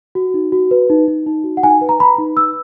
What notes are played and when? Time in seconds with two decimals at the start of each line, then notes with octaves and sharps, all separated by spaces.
0.15 F#4
0.34 D#4
0.52 F#4
0.71 B4
0.90 D#4
1.08 D#4
1.26 D#4
1.44 F#4
1.57 F#5
1.63 D#4 G#5
1.81 B4
1.89 A#5
1.99 B4 B5
2.18 D#4
2.36 B4 E6